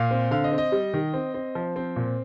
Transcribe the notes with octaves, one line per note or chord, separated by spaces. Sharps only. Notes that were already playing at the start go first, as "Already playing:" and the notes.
Already playing: A#2 F5
C4
D3 F5
D#5
C4
D#5
G3
D#3
C4
C4
F3
C4
A#2